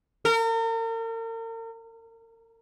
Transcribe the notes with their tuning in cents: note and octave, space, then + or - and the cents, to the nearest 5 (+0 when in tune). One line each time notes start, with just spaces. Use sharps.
A#4 -40